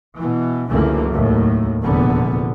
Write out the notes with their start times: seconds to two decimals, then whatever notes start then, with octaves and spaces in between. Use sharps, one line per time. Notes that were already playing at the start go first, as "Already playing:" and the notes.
0.17 B2 E3
0.70 C#2 F#2 D3 E3 A3 A#3
1.12 D#2 A2 F#3
1.83 F1 E2 A#2 D3 B3